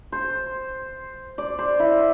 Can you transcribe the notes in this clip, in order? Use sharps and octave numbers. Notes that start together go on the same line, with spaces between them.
C5
D5
C5
E4